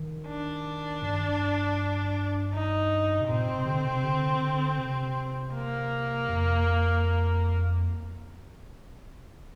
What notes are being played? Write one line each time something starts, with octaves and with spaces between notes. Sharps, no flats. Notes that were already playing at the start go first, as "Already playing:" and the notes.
Already playing: D#3
D4
G2
D#4
C3
A#2 C4
C3
D3
C3
D3
D3
C3
A#3
F2